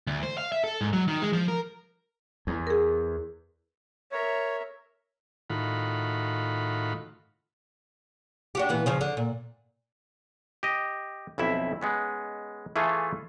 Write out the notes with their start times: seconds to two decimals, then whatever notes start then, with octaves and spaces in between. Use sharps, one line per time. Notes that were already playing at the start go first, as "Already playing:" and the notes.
0.07 D2
0.23 C5
0.38 F5
0.52 E5
0.64 A4
0.81 G#2
0.93 F#3
1.08 D#3
1.22 G#3
1.33 F3
1.48 A#4
2.47 E2
2.67 G#4 A#4
4.12 A#4 C#5 E5
5.50 A2 D#3 F4 F#4 B5
8.55 D4 F#4 G4
8.69 A#2 E3 B3
8.86 C#3 F3 F4
9.01 D3
9.17 A#2
10.63 G4 D#5
11.38 B1 F2 E4 E5
11.81 G#3 B3 C#4
12.76 E3 A3 F4 G#4 A4